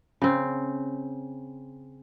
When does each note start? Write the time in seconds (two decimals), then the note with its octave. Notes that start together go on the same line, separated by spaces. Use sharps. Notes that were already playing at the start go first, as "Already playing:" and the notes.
0.22 C#3 C4